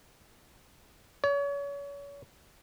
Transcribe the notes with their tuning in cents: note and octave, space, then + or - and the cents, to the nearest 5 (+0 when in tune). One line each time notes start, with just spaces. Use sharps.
C#5 +35